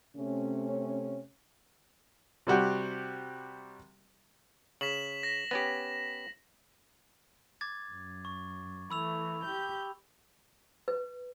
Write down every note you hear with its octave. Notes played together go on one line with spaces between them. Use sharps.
C3 A3 C#4
C3 G3 F#4 G4
C#3 B6 E7 F#7
A#6 B6
B3 C#4 G4
D6 G#6 A6
F#2
C#6
E3 A3 B5 E6 F7
G4 G6
B4